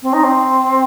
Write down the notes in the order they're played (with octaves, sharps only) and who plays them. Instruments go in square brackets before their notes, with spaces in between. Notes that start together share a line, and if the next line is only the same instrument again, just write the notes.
[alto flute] C4
D#4
C4